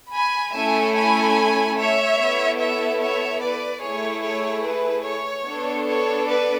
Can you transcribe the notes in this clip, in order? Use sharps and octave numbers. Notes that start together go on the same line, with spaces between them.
G#5 B5
A3 C#4 E4 A4 E5 G#5
G#5 B5
C#5 E5
B3 E4 A4
C#5 E5
C#5 E5
B4 D5
A3 E4 G#4 C#5
C#5
B4
C#5
B3 D4 A4
C#5
B4 D5